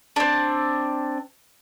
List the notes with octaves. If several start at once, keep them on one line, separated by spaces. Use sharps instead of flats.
C4 D4